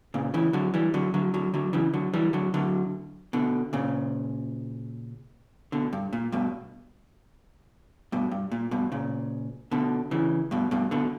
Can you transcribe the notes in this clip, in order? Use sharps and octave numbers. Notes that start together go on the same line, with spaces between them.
A#2 C#3
C#3 E3
D3 F#3
E3 G3
D3 F#3
D3 F#3
D3 F#3
D3 F#3
C#3 E3
D3 F#3
E3 G3
D3 F#3
D3 F#3
B2 D3
A#2 C#3
B2 D3
G2
A#2
G2 B2
G2 B2
G2
A#2
G2 B2
A#2 C#3
B2 D3
C#3 E3
G2 B2
G2 B2
B2 D3